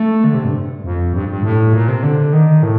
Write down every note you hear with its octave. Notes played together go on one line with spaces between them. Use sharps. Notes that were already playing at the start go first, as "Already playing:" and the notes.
Already playing: A3
D3
C3
G2
F2
G2
G2
A2
A#2
C3
D3
D#3
A2